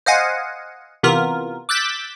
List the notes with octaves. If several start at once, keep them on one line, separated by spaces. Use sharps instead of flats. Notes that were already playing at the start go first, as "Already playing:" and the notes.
C5 D#5 F5 F#5 G#5
C3 E3 B3 F4 A#4
D6 E6 F#6 G6 A6 B6